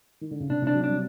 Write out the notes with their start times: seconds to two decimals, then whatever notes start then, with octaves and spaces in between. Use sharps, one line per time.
0.21 D#3
0.31 D3
0.40 C#3
0.50 C3 D4
0.62 C3 D4
0.75 F#3
0.84 G3 D4